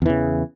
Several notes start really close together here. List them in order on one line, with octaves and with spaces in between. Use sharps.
E2 E3 C#3